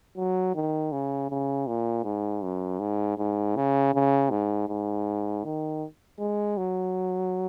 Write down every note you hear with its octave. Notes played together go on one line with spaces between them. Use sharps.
F#3
D#3
C#3
C#3
A#2
G#2
F#2
G#2
G#2
C#3
C#3
G#2
G#2
D#3
G#3
F#3